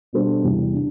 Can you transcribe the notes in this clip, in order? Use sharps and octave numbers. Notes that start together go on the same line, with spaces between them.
B2 G3 D4 A4 C5
E2 C3 E3 G3
D3